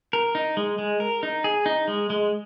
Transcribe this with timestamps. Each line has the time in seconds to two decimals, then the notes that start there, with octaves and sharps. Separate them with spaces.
0.13 A#4
0.35 D#4
0.57 G#3
0.78 G#3
1.00 A#4
1.23 D#4
1.44 G#4
1.66 D#4
1.88 G#3
2.10 G#3